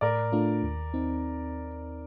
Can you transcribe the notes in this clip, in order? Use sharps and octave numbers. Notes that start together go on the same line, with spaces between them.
A2 A#4 D5
A3 D4 F4
D#2
C4 D#4